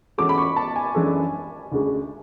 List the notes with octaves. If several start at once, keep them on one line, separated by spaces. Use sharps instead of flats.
E3 G#3 C#4 F#4 A4 D6
B5
C#6
A5
G#5
F#2 E3 G#3 D4 A4
D2 C#3 G#3